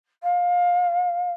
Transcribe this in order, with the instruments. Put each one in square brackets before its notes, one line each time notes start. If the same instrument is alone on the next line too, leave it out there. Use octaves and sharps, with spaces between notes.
[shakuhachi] F5